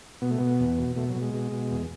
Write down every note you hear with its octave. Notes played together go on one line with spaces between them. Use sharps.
B2 B3
A3
B2 B3
E2
B2
B2 A3
F#3
B2
G#3
B2
B2
E2